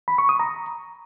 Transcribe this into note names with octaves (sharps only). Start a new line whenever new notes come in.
B5
C#6
D#6
A#5